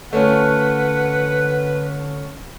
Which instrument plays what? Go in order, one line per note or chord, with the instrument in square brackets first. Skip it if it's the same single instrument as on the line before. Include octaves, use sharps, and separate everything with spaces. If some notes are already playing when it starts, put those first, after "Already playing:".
[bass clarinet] D3 [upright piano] A3 C#4 F4 [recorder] B4 [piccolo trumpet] F#5